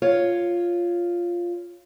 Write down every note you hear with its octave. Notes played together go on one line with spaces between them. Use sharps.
F4 C#5